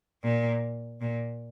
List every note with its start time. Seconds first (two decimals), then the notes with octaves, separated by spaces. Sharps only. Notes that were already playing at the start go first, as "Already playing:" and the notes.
0.23 A#2
1.01 A#2